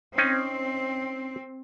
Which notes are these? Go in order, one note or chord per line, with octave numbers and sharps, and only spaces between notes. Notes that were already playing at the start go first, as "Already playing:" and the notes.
C4 C#4 D#4